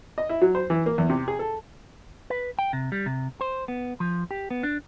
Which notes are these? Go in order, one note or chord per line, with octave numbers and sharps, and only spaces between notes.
D#5
E4
F#3
C5
E3
A#3
E2
C3
G#4
A4
B4
G5
C3
G3
C3
C5
B3
F3
G4
B3
D4